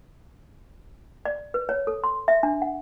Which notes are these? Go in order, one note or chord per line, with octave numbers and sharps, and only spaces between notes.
D5
B4
C#5
A4
C6
E5
D4
F#5